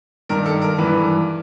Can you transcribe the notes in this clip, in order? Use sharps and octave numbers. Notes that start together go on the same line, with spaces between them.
G2 D#3 A#4
A4
A#4
G2 E3 B4